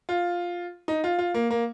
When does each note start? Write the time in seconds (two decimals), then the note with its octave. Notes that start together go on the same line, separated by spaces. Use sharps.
0.09 F4
0.88 D#4
1.04 F4
1.18 F4
1.34 A#3
1.51 A#3